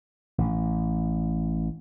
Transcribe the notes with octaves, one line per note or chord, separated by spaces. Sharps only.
A1